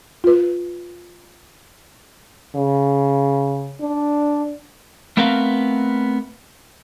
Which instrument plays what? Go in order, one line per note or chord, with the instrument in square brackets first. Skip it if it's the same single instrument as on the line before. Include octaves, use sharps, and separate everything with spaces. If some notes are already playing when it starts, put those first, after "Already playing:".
[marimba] F4 B4
[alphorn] C#3
D4
[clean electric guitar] A3 B3 C4 A#4 B4 F5